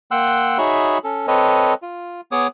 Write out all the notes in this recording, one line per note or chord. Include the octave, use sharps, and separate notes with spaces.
A#3 F#5 G5 C6 E6 F#6
D#4 F#4 G#4 C#5 E5 B5
C#4 A4
C4 A4 B4 C#5 D#5
F4
B3 G#4 C#5 D6 D#6